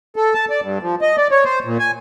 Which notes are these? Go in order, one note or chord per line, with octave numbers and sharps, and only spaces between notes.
A4
A5
D5
G2
F3
D#5
D5
C#5
C5
A#2
G#5